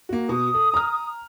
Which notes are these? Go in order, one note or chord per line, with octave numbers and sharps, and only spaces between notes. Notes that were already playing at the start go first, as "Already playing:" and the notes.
A#3 F#4
B2 D#6
A4
A#5 F6